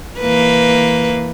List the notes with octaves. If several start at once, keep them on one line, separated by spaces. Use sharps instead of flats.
E3 A#3 B4